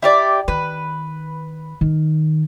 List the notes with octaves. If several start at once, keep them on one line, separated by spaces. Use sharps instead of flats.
E4 G4 D5
D#3 B4
D#3